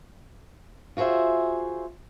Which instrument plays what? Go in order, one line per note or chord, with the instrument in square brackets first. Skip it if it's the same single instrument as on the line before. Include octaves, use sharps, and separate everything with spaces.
[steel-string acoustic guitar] F4 F#4 G#4 C5 E5